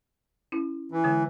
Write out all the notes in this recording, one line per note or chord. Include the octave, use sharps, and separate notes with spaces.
C#4 E4
E3
D3 G#3